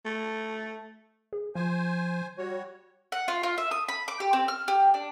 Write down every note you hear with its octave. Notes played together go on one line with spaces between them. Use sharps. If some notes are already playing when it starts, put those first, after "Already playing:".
A3
G#4
F3 C5 G#5
G3 F#4 C#5
F#5
F4
F4
E5
D#6
B5
D6
G4
C4
F6
G4
D4